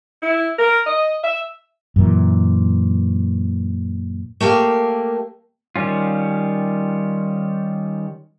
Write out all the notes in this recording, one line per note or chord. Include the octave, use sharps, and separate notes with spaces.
E4
A#4
D#5
E5
F#2 A#2 E3
A3 A#3 G4 F5
D#3 G3 C#4 F4